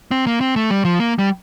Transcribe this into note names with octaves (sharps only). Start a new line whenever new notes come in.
C4
A#3
C4
A3
G3
F3
A#3
G3